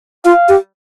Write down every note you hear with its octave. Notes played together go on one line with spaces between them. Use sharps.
F4 F5
G4